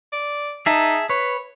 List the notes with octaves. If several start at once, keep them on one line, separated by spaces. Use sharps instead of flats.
D5
D#4 G#4 E5 A5
B4 C#5